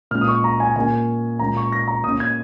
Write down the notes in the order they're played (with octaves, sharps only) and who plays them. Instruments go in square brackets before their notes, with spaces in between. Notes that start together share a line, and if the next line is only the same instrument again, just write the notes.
[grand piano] A#2 G#3 C#4 F6
D#6
C#6
A#5
G#5
A#2 A#3 C#4 G#5
A#2 G#3 C#4 A#5
C#6
A#6
A#5
A#2 A#3 C#4 D#6
G#6